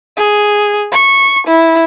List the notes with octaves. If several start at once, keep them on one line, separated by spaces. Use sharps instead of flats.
G#4
C#6
E4